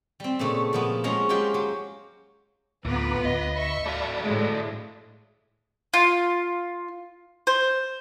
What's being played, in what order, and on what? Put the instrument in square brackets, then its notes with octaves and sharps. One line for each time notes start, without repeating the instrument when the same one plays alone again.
[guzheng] G3 C4
A#2 C#3 G3 A3
A#2 F3 B3
F3 G#3 C#4 F4 A#5
F#3 G#3 F4 G4 G5
F#3
[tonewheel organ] D2 A#5 D6 [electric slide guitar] A2 [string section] B3 F4 B4
[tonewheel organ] D2 B5 [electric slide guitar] D#5
[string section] E5 C#6
[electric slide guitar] A3 F#4 F5 [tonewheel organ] D5 A5 B5
[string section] A2 G#3
[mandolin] F4
C5